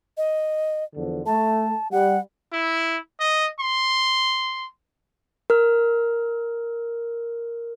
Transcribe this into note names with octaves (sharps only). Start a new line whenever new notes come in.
D#5
E2 D3 F3
A3 A5
G3 F#5
E4
D#5
C6
A#4 F6